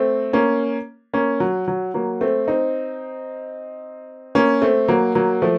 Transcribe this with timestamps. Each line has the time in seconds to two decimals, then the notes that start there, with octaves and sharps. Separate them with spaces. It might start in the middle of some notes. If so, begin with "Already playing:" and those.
Already playing: A3 C4
0.33 A#3 C#4
1.14 A#3 C#4
1.40 F#3
1.68 F#3
1.94 F#3 A#3
2.21 A3 C4
2.48 C4 D#4
4.35 A#3 C#4
4.62 A3 C4
4.88 F#3 A#3
5.15 F#3 A#3
5.42 F3 A3